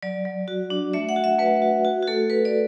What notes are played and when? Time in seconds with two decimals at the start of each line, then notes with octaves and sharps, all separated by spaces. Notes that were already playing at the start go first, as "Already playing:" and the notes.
0.03 F#3 D5
0.25 F#3
0.48 F#4
0.70 D4
0.93 A3 E5
1.09 F#5
1.16 F#4
1.24 E5
1.39 A3 B4
1.62 F#4
1.85 F#4
2.03 F#4
2.07 A3 A4
2.30 F#4 B4
2.45 D5